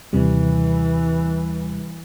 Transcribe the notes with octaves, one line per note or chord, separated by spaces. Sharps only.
D#2 C3 E3 G3